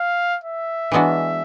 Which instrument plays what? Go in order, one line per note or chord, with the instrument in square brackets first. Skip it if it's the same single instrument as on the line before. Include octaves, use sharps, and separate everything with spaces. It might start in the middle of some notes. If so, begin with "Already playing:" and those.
Already playing: [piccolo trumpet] F5
E5
[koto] E3 G#3 B3 D4 F#4